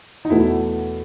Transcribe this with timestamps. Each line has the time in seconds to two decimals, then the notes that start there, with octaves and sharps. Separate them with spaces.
0.25 D#4
0.29 E2 B2 A3 E4